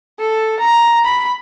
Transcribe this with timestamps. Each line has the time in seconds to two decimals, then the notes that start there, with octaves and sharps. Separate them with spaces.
0.19 A4
0.59 A#5
1.05 B5